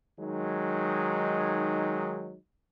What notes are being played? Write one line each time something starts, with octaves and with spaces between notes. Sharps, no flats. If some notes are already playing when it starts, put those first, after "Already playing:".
D#3 F#3 G#3 D#4